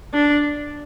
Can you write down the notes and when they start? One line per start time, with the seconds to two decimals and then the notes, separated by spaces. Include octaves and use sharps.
0.14 D4